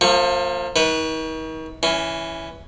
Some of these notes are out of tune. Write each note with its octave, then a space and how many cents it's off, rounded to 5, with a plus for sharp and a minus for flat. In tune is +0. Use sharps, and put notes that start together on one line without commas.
F3 +25 A#3 -30 C#6 +0
D#3 +40 B4 +0
E3 +0 C#4 +15